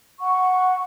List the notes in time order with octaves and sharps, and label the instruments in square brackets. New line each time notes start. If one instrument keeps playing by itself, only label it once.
[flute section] F#5 C#6